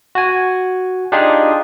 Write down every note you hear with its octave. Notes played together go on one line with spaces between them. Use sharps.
F#4 G#5
D4 D#4 F4 G4 G#4